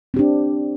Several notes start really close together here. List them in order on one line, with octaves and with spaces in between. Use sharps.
C4 G4 D4